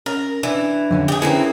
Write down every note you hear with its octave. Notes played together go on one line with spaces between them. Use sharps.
C#4 A#4
E3 D4
F2 D3 C#4
G4 G#4
E3 A#3 C4 C#4 E4 G#4